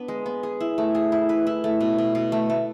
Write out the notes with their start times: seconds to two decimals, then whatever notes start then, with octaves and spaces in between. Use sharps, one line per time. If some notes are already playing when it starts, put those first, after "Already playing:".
Already playing: B3 D4
0.08 G#3
0.26 B3
0.43 G#4
0.60 E4
0.78 A3
0.95 G#4
1.12 E4
1.29 B4
1.47 E4
1.64 A3
1.81 B2
1.98 B2
2.15 B2
2.32 A3
2.50 A3